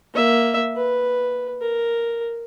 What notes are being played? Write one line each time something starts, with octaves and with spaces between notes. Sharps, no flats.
A#3 E5
B4
A#4